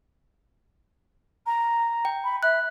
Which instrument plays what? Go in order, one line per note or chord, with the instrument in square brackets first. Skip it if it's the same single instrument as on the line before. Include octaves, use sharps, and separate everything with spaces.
[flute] A#5
[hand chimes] G5
[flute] B5
[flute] E5 [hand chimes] F#6